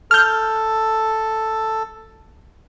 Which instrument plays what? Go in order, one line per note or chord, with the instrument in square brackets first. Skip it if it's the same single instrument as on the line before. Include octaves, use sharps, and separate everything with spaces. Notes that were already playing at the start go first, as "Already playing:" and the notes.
[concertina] A4 [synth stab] F6 G6